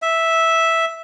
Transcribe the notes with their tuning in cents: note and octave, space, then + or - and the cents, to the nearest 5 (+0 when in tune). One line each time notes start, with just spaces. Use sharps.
E5 -5